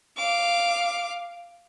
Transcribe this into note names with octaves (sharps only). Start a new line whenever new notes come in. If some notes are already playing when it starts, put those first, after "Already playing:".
F5 D6